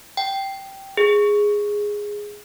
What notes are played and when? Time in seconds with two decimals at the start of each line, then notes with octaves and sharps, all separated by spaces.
0.17 G5
0.97 G#4